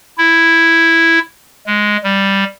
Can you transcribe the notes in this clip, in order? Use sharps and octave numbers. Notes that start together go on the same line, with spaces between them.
E4
G#3
G3